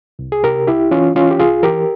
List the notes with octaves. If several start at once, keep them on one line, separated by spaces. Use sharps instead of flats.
C2
G#4
C3 G4 A#4
C2 E4 G4
E3 C#4 F4
E3 C#4 F4
G4
C2 F4 G#4
E3 G4 A#4